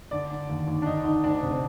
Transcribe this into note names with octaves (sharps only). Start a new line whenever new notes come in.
D3 D5
D3
D#2
D#2
D4
D3 D#4
D3 D#4
D2 D4
C3
C4